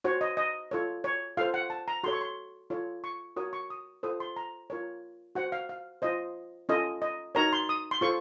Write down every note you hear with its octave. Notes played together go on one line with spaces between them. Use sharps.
F#4 C5 C#5
D#5
D#5
F4 A4 C#5
C#5
F4 A4 C5 F5
F#5
A5
A#5
F#4 A4 C#5 C6
C#6
C6
F4 A4 C#5
C#6
F#4 A#4 C#5 D#6
C#6
D#6
F4 A4 C5 D#6
C6
A#5
F4 A#4 C#5
F#4 C5 F#5
F5
F5
F4 C5 D#5
C#4 F4 A4 D#5
D#5
D#4 F#4 A#4 C#5 A#5
C6
D#6
C6
F4 A4 C5 C#6